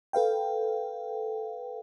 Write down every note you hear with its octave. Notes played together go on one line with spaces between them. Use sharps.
A4 B4 F5 G5